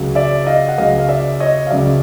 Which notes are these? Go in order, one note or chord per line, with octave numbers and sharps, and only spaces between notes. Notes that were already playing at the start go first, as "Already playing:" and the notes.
Already playing: C#2 C#3 F#3
D5 E5
D#5 F5
F#5
C#2 C#3 F#3 D#5 F5
F5
D5 E5
C#5 D#5
F5
C#2 C#3 F#3 D5 E5